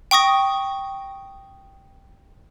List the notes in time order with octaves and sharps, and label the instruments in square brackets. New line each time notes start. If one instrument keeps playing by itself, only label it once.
[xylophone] G5 C#6 D#6 A#6